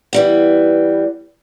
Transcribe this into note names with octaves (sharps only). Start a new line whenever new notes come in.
E3 G3 B3